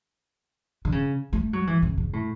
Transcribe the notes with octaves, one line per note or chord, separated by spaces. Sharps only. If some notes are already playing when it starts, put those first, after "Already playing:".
D3
C#3
A3
F#3
E3
C#3
C#3
A2